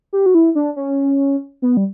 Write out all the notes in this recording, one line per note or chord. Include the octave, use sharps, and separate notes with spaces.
G4
F#4
E4
D4
C#4
B3
G3